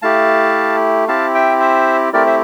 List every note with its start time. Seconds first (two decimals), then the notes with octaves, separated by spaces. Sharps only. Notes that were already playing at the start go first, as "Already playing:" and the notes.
0.02 A3 E4 G4 F5 A5
1.08 C4 E4 G4 F5 A5
1.35 E5 G5
1.60 C5 E5
2.13 A3 C4 E4 G4 A#4 D5
2.26 C5 E5